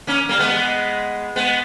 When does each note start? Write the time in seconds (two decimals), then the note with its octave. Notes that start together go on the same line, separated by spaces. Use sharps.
0.07 A#3 C#4
0.29 G3 A#3
0.39 G#3 B3
1.36 G#3 B3